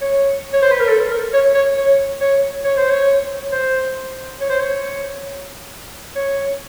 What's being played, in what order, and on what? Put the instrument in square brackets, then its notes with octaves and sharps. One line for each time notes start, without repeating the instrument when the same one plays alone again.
[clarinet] C#5
C#5
C5
B4
A#4
A4
A#4
C#5
C#5
C#5
C#5
C#5
C5
C#5
C5
C#5
C5
C#5
C#5